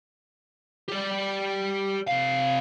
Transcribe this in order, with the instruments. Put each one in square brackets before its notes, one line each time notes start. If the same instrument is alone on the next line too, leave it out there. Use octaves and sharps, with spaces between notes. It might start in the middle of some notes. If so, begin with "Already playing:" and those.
[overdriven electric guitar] G4 D5
C3 F5